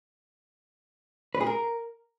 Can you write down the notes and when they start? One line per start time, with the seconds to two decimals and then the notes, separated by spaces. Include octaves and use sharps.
1.35 B4
1.41 G#4
1.47 A#4